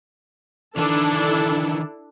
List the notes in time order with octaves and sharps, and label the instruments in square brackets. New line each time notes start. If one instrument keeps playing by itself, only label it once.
[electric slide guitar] D#3 E3 [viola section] D4 E4 A4